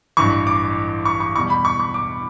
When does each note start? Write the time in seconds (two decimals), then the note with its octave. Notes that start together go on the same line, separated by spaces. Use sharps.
0.17 A1 G2 E3 C#6
0.47 D6
1.05 C#6
1.20 C#6
1.35 E2 B2 G3 C#6
1.50 B5
1.65 C#6
1.80 C#6
1.94 D6